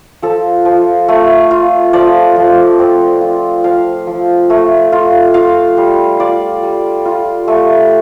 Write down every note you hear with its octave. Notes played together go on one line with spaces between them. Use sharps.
F3 A4
F3
A3
F4
F3 D5
F3
C4
F4
F3 F5
F3
A3
F4
F4 F5
G3
F4 D5
G3
F4
A3